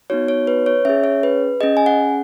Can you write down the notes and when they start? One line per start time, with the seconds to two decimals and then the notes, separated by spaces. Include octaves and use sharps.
0.10 B3 D#4 F#4 C#5
0.28 C#5
0.47 B4
0.66 C#5
0.85 C#4 G#4 E5
1.04 C#5
1.23 B4
1.61 C#4 G#4 D#5
1.77 G#5
1.86 F#5